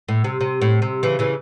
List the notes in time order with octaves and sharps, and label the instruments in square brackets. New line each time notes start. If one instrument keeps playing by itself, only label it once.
[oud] A2
C3
C3
A2
C3
C#3 E3
C#3 E3